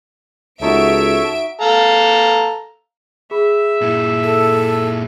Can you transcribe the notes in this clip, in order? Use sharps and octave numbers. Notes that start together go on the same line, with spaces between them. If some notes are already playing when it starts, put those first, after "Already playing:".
C#2 D#4 F#4 A4 C#5 E5 D7
A4 F5 A#5
G#4 E5 B5
A#2 E4
A4